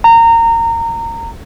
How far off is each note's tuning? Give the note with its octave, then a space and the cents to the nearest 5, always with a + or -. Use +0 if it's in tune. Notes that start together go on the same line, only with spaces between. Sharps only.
A#5 -20